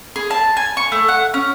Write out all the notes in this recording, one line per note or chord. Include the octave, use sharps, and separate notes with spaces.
G#4
A5
G#5
C#6
A3
F#5
C#4